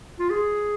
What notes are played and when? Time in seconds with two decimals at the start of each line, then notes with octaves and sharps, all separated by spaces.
0.19 F4
0.30 G#4